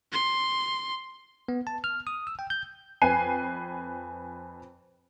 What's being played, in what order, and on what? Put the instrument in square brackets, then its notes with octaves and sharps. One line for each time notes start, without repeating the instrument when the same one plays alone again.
[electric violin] C6
[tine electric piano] B3
A5
F6
D#6
E6
G5
G6
[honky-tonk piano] F2 B4 G5 G#5 C7 D#7